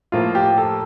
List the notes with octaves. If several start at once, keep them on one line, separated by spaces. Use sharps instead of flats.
A2 F3 A#3 F4
G4
A4